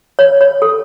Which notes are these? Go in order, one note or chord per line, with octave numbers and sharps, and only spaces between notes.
C#5
C#5
A4